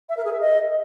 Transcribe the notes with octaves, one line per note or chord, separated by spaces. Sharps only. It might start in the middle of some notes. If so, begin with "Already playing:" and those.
E5
A#4
G#4
E5
D#5